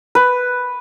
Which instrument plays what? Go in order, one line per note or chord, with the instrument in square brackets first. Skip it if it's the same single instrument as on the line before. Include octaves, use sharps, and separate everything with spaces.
[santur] B4